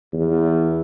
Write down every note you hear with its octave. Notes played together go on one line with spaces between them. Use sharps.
E2